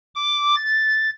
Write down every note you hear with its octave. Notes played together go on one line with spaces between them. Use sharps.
D6
A6